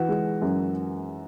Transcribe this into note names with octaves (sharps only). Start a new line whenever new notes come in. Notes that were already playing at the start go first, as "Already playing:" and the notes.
Already playing: E3 F#4
G#3
F#2